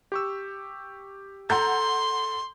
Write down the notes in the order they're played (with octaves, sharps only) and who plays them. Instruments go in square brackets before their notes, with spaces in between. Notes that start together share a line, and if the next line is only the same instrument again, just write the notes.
[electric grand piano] G4 C#6 E6
[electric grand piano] A4 [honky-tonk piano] F#5 A#5 G6 [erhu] C6